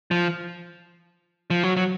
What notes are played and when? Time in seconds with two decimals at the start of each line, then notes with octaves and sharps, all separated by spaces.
0.11 F3
1.50 F3
1.63 F#3
1.77 F#3